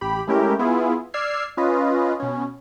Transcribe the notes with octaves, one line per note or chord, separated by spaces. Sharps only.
A1 G4 B5
G#3 A3 C#4 E4 G4 A#4
B3 E4 F4 G#4
D5 E6 F6 G#6 C7
C#4 F4 B4 D#5
B2 C#4